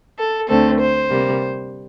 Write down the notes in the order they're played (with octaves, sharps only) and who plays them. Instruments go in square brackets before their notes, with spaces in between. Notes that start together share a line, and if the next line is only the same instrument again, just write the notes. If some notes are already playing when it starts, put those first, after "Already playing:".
[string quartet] A4
D2 D3 A3 C4 A4
C5
C3 G3 A#3